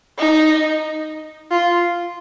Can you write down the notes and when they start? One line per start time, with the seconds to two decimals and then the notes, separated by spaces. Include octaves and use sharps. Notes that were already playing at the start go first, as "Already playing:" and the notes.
0.18 D#4
1.51 F4